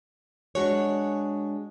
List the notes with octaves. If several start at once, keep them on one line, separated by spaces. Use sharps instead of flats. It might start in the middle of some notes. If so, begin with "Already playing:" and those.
G#3 D4 F#4 G#4 C#5